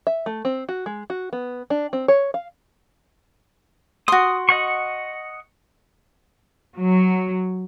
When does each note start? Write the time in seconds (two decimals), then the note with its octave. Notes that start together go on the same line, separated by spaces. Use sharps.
0.07 E5
0.26 A3
0.45 C4
0.69 F#4
0.86 G#3
1.10 F#4
1.33 B3
1.70 D4
1.93 C4
2.08 C#5
2.34 F5
4.08 F#4 C6 D#6
4.49 D#5 F#5 C#6
6.77 F#3